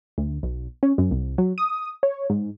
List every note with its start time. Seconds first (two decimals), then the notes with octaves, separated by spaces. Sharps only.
0.18 D2
0.43 B1
0.83 C#4
0.98 F#2
1.11 C2
1.38 F#3
1.58 D#6
2.03 C#5
2.30 G#2